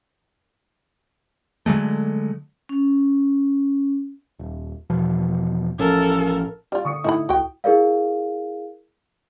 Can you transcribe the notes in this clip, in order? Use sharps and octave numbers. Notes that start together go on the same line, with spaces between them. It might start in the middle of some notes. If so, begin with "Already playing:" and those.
D3 F#3 G#3 A3
C#4
D#1
E2 B2 F3
A1 F3 C#4 A4 A#4
G3 F4 D5
D3 C#6 D#6 C#7
A2 D#4 E4 B5
C#2 F#4 G5
E4 G#4 A#4 D5 F5